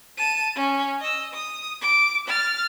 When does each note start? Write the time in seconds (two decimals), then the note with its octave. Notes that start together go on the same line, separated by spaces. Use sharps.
0.18 A5 D#7
0.55 C#4
1.00 D#5 E6
1.34 D#6
1.81 D6
2.28 F6 A6